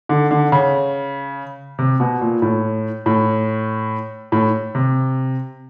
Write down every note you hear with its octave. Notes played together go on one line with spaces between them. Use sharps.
D3
D3
C#3
C3
B2
A#2
A2
A2
A2
C3